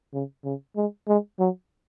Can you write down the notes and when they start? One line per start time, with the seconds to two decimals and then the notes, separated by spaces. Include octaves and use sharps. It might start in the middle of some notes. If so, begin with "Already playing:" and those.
0.14 C#3
0.45 C#3
0.76 G#3
1.08 G#3
1.39 F#3